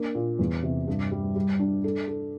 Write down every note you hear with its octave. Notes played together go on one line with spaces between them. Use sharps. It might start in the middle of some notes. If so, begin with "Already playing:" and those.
Already playing: A#3 D4
A#2
E2
C3
G2
G3
G3
D4
A4
A4